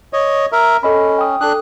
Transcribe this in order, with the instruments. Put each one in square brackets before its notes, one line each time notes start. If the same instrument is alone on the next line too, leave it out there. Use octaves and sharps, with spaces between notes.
[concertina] C#5 D#5
A#4 E5
[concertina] C#4 [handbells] A4 D#5 B5
[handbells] G5 D#6
[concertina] D4 F#6 [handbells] A4 D#6